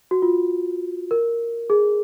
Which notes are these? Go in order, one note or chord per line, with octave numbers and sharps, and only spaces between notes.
F#4
F4
A#4
G#4